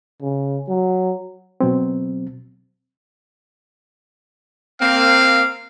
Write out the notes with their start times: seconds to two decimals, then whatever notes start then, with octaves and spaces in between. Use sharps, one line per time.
0.22 C#3
0.68 F#3
1.60 B2 F#3 C4
4.81 A#3 C4 F5